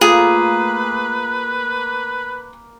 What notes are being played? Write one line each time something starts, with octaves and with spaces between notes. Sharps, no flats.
A3 A#3 F4 G#4 B4